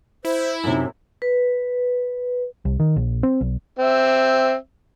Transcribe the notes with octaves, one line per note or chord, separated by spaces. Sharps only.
E4 C5
F#2 C3 D#4
B4
C2
D#3
A#1
C4
B1
C4 E5